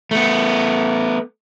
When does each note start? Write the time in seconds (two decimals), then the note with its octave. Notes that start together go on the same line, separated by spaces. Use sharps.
0.11 A3 B3